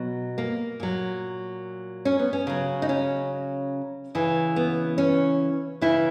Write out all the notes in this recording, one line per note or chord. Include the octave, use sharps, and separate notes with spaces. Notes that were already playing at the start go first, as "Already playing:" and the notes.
Already playing: B2 F#3
A#3
A#2 F#3
C#4
B3
C#4
C#3 F#3
D#4
C#4
C#3 E3
B3
C#4
C#3 E3 E4